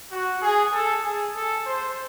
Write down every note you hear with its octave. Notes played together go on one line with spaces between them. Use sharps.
F#4
G#4
A4
G#4
A4
C5